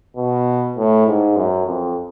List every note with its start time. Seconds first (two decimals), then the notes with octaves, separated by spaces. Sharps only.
0.17 B2
0.76 A2
1.07 G#2
1.36 F#2
1.67 F2